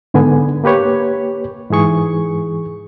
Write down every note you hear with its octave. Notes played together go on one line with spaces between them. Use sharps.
G#2 D3 B3 G#5
A#3 G4 B4 C#5
G#2 E3 G#4 C#6